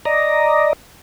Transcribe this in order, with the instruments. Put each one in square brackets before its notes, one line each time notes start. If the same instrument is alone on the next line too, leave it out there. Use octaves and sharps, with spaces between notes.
[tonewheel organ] D5 D#5 A#5